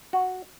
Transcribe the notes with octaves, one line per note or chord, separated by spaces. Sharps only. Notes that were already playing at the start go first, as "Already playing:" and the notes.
F#4